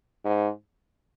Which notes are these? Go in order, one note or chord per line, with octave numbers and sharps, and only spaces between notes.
G#2